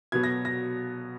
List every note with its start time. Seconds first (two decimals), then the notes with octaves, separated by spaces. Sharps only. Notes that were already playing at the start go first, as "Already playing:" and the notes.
0.12 B2 F#3 B3 G#6
0.24 A#6
0.45 A#6